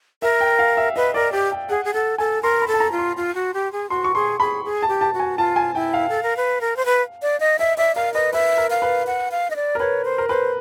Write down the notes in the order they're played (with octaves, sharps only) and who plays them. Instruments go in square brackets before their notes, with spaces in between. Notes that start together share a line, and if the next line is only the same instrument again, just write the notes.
[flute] A#4 [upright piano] E5
[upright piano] G5
F5
E5
[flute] B4 [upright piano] D#5
[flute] A#4 [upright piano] D5
[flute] G4 [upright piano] D5
[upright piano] G5
[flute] G#4 [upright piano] F#5
[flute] G#4
[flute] A4 [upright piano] F#5
[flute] A4 [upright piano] G#5
[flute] A#4 [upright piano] C6
[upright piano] B5
[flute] A4
[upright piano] A5
A#5
[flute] F4
[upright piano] C6
[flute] F4
F#4
G4
G#4
[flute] F#4 [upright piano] C6
[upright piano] C#6
[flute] G#4 [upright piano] C6
[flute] G#4 [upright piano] B5
[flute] G#4
[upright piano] A5
[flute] G4
[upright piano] A5
[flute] F#4
[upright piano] G#5
[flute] F4 [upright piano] A5
[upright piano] G#5
[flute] E4 [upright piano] G5
[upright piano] F5
[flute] A4
A#4
B4
A#4
C5
B4
D5
D#5
[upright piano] D#5 [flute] E5
[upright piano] D5 [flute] E5
[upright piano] A#4 [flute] F5
[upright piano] B4 [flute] D#5
[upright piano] B4 [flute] E5
[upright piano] A#4
[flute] F5
[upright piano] B4
[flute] F#5
F5
D#5
D5
[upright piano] A#4
[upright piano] B4 [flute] C#5
[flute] C5
[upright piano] A#4
[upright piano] B4 [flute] C5